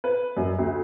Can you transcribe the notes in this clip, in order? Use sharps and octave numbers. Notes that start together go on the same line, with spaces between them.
B4
F#2
D2